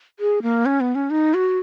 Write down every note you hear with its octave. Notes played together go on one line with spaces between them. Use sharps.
G#4
A#3
C#4
B3
C#4
D#4
F#4